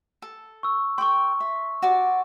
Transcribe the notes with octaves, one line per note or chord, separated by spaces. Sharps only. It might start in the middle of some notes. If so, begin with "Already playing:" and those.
A4
C#6 E6
A4 G5 C6 C#6
E5
F#4 D5 D6